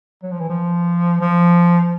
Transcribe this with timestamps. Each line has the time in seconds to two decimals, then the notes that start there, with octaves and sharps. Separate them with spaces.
0.23 F#3
0.31 F3
0.40 E3
0.49 F3
1.21 F3